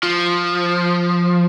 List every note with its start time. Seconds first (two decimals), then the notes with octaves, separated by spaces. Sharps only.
0.03 F3